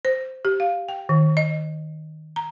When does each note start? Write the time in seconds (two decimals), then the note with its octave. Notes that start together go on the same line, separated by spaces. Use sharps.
0.05 C5
0.45 G4
0.60 F5
0.88 G5
1.09 D#3
1.37 D#5
2.36 A#5